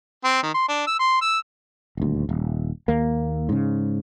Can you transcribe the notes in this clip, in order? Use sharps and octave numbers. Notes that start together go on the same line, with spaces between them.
C4
D#3
C6
D4
E6
C6
E6
D#1 D2
D#1
D#2 A#3
G#2 C#3